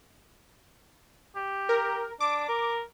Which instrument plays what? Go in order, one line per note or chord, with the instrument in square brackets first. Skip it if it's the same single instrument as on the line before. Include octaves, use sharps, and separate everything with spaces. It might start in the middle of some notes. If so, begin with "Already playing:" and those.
[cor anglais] G4
[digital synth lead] A#4
[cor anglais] D4 [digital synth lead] D6
[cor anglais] A#4